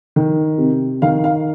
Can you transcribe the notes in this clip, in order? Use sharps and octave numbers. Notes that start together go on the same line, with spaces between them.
D#3
C3
D#3 F5
F5